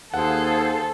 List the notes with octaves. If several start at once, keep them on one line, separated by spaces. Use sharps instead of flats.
D#2 G#4 A4 C5 F5 F#5